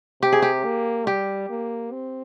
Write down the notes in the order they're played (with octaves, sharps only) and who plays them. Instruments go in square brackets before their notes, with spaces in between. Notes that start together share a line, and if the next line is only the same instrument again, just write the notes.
[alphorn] C3 [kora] G4
[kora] G#4
G4
[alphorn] A#3
[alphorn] G3 [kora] G4
[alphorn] A#3
C4